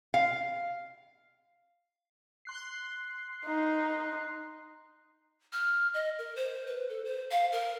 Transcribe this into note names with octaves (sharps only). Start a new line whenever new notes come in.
F5
C6 F#6 C7
D#4
F6
D#5
A#4
C5
B4
A4
C5
F5
A#4